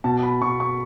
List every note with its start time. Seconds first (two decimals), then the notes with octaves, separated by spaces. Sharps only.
0.04 B2 A5
0.23 B5
0.42 B2 C#6
0.60 C#6